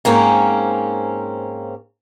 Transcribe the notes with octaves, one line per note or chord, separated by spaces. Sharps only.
G#2 A#3 C4 C#4